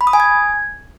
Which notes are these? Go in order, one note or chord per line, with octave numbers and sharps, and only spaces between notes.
B5
D#6
G#5
G#6